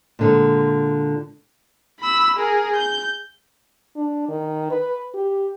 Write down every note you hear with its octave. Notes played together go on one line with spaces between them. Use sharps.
A#2 D3 G#3
B5 E6
G#4 A#4
G6
D4
D#3
B4
G4